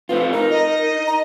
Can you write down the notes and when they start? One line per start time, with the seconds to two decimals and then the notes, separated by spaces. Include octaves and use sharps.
0.09 A3 C4 F4 B4
0.33 D#4 A#4
0.51 D#5
1.07 A#5